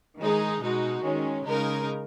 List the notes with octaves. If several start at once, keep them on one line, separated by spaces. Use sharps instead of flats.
D#3 G#3 D#4 G#4
B2 G#3 D#4 F#4
D#3 G#3 C#4
C#3 G#3 D#4 A#4